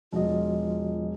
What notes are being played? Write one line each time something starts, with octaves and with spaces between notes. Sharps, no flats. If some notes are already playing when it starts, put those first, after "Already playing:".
E1 F3 F4 F#4 D#5